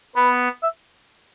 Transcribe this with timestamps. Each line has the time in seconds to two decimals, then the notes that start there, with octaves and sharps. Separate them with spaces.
0.16 B3 B4
0.63 E5